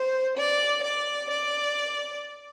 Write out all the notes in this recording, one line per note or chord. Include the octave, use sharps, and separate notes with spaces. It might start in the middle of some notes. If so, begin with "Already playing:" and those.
Already playing: C5
D5
D5
D5